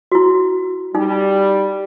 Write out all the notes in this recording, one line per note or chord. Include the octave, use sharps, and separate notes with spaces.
E4 F#4
G3 D#4